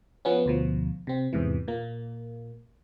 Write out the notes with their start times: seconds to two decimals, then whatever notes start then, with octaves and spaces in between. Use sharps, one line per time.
0.25 F3 B3 C#4
0.46 D2 B2 F3
1.07 C3 C4
1.33 E2 G#2 C3 E3
1.68 A#2 A#3